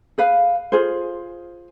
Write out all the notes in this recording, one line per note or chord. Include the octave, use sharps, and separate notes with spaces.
G#4 B4 F5
F4 G#4 C5